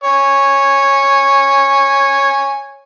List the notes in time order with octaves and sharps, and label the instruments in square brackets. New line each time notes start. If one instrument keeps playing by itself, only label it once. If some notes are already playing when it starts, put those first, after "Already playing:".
[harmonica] C#5 G#5